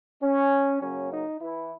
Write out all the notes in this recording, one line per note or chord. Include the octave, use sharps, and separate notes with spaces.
C#4
F#2 C#3 F#3 A#3 C#4
D#4
E3 E4